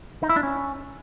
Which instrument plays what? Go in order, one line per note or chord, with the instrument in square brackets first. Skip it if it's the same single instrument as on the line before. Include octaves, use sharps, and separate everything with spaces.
[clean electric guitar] D#4
E4
D4
C#4